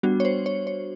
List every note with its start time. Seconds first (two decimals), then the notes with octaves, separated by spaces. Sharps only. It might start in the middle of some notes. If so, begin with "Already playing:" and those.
0.03 G3 B3 D4 F#4
0.20 C#5
0.25 C5
0.46 C#5
0.67 C#5